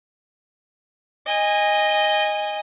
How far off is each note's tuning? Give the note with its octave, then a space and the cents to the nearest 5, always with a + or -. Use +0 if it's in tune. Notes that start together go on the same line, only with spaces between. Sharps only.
D#5 +0 G#5 -20